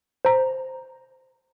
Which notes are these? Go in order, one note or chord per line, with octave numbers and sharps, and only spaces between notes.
C5 A#5